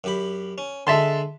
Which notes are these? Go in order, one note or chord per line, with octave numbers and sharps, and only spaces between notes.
F#2 G4 B5
C#4
D3 G#3 E5 A5 C6